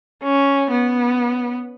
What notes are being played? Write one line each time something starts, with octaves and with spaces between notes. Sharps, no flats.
C#4
B3